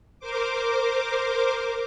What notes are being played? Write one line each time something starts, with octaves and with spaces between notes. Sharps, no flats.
A#4 C5 D6